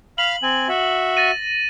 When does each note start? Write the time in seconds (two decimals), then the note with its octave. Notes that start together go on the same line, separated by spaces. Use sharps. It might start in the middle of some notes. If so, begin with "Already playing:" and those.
0.18 F5 B5 F6 F#7
0.43 C4 G#5
0.68 F#4 E5
1.17 A6 A#6 D#7